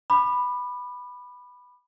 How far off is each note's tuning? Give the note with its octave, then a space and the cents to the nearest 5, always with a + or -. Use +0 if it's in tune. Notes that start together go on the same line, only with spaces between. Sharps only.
B5 +0 D6 +40